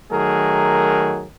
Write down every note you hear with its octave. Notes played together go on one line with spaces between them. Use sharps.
D#3 F#3 A3 G#4 A#4